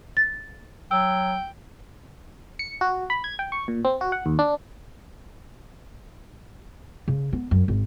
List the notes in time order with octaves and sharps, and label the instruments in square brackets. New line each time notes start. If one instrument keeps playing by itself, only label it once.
[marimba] A6
[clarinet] F#3 [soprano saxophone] G5 [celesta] E6
[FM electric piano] C#7
F#4
B5
G#6
G5
C#6
A#2
C4
F#4
F#5
D#2
D4
[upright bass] C#3
B3
F#2
G#1